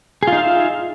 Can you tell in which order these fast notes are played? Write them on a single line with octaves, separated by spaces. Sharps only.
G#4 F4 D#4 F5 E5